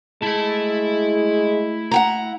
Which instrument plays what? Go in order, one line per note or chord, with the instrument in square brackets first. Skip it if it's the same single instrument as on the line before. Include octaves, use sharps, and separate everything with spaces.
[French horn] G#3 [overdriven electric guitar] A3 A5 [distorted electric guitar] E4 B5
[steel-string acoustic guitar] F#5 G5 A#5